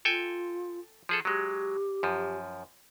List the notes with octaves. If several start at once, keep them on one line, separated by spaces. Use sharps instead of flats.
F4 A4 G5 G#5
F3 G#4 A4
F#3 G#3 G4
F#2 F3